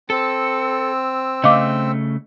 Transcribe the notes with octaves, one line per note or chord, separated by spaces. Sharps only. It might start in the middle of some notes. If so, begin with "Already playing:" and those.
C4 A4 E6
C#3 A3 D#5 F5 D6